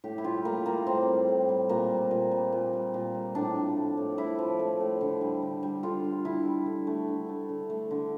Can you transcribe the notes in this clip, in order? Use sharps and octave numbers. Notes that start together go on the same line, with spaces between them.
A2 G4
E4
G3 F4
A2 A#3
G3 A#3
A2 C4
G3
A2
G3
A#2 A#3
G3
A#2
G3
A#2
G3
A#2
G3
A2 D4
F3
A3
A2
A2 E4
F3
A3
A2
D3
G3
D3
G3
D3 F4
G3
D3 E4
G3
D3
A3
D3
A3
D3
A3
D3